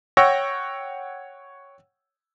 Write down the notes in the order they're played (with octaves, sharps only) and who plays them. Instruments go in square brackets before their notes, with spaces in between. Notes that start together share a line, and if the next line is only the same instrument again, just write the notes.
[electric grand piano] C#5 F#5 G5 C#6 E6 A#6